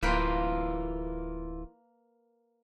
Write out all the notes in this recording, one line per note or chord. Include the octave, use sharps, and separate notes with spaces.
D1 E3 A#3 F4 B4 G5